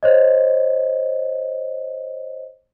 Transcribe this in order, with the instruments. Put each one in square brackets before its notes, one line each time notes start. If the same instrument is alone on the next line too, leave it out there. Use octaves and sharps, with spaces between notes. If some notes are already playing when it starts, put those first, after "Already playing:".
[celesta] C5 C#5 D#5